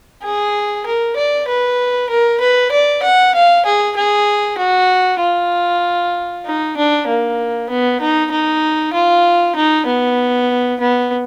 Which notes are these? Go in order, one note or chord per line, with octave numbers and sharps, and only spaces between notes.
G#4
A#4
D5
B4
A#4
B4
D5
F#5
F5
G#4
G#4
F#4
F4
D#4
D4
A#3
B3
D#4
D#4
F4
D#4
B3
B3